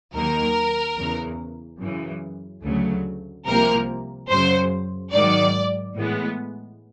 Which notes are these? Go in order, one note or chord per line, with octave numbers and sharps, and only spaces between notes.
D#2 D#3 F#3 A#3 A#4
E2 C#3 E3
F#2 C#3 E3
D2 C#3 F#3 A3
C2 C3 F3 A#3 A#4
F#2 C#3 F#3 C5
G#2 D#3 F#3 D5
A2 E3 G#3 B3